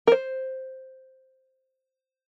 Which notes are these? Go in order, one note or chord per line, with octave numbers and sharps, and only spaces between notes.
A#4
C5